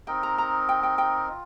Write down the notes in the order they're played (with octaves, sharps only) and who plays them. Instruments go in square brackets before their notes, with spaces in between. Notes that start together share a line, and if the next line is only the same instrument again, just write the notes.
[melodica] C4 D#4 A#4 D#5 [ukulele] G5
[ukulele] A#5
A#5
G5
G5
G5
[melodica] F4